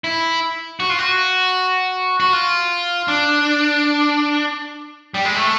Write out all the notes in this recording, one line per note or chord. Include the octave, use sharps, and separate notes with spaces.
E4
F#4
F4
F#4
F#4
F4
D4
G3
G#3
A3